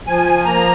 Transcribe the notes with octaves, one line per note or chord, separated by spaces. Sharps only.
F3 G#5
A#3 A#5